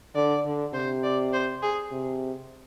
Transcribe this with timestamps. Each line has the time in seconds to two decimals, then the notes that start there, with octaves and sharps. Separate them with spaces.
0.15 D3 D5
0.45 D3
0.73 C3 C5
1.03 D5
1.33 C5
1.62 G#4
1.91 C3